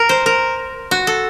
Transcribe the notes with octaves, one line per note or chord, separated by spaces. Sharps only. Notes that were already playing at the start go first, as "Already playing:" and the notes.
Already playing: A#4
C5
A#4
F#4
A4